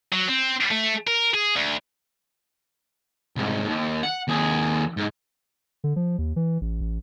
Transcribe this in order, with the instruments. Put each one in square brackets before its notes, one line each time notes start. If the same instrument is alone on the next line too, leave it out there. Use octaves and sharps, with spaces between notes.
[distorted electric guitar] F#3
C4
A3
A#4
G#4
D2
C2 G#2
D#2
F#5
D#2 G#4
G#2
[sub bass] D3
F3
D#2
E3
A1
A1